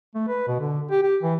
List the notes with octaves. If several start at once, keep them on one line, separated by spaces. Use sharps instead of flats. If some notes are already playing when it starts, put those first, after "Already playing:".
A3
B4
B2
D3
G4
G4
E3